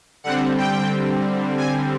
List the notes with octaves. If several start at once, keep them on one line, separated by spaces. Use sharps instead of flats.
D3 G3 C4 F#5
G5
G#5